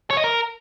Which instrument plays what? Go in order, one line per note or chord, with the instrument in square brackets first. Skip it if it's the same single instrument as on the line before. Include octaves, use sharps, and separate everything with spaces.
[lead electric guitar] C#5
D#5
A#4